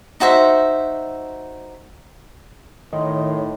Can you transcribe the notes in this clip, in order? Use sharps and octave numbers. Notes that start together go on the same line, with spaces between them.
D#4 F#4 C5 E5
A2 D#3 D#4 C#5 D#5 C6